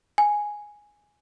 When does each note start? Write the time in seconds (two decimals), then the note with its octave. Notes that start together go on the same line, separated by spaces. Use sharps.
0.18 G#5